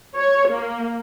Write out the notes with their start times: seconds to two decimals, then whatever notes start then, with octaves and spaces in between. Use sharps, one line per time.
0.17 C#5
0.50 A#3